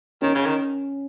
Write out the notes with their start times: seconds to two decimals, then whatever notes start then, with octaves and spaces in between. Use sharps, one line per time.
0.22 D#3 C#4
0.35 C#3
0.46 D#3